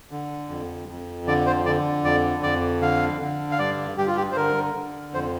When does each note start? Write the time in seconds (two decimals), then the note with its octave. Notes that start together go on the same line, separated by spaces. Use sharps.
0.11 D3
0.49 F2
0.88 F2
1.27 D3 D5
1.46 C5
1.65 D3 D5
2.04 F2 D5
2.43 F2 D5
2.81 D3 F5
3.21 D3
3.52 F5
3.59 G2 D5
3.98 G2 G4
4.07 F4
4.17 G4
4.32 C5
4.36 D3 A#4
4.75 D3
5.14 F2 C5